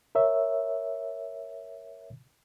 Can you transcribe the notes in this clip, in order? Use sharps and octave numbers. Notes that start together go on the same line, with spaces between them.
A#4 C#5 E5